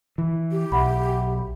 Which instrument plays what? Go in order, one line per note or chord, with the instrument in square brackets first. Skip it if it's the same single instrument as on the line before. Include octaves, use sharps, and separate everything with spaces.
[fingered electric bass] E3
[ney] G4
[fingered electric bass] B1 [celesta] E5 F#5 B5